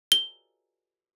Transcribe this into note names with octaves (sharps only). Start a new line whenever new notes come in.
G7